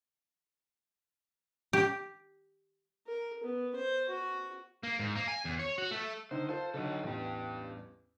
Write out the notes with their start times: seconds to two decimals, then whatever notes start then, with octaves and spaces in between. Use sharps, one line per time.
1.73 G4
3.07 A#4
3.44 B3
3.76 C5
4.09 F#4
4.83 A#3
4.99 G#2
5.15 A#3
5.28 G#5
5.45 E2
5.59 C#5
5.78 F#4
5.91 A3
6.31 D3 D#3 D#4 C5
6.49 F4 A4 C5
6.74 D3 F#3 D#4 A4
7.03 A1 E2 G2 G4